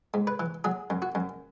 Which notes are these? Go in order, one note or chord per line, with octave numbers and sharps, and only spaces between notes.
G#2
B4
E3
F#3 G#4
F#2
F#4
F#2